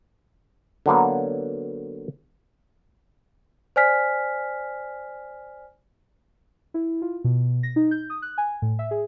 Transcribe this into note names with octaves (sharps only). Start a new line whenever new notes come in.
D3 F#3 A#3 B3
C5 D5 G#5 F6 B6
E4
F4
B2
A#6
D#4
G6
D#6
F#6
G#5
A2
E5
G#4